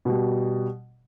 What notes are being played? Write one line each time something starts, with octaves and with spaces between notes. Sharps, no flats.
B2 G3